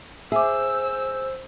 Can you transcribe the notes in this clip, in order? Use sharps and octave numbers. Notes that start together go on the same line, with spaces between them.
G#4 C5 E5 D6 E6